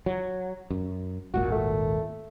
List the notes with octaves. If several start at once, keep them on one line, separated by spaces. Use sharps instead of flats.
F#3
F#2
D#1 G#1 A#2 F#4
A3